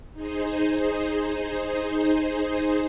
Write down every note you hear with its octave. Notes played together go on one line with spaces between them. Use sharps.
D#4 G#4 C5